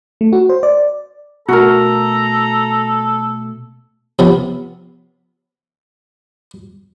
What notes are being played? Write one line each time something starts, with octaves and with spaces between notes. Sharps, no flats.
A3
F#4
C5
D5
B2 A3 F#4 A4 A#4 A#5
C3 F3 B3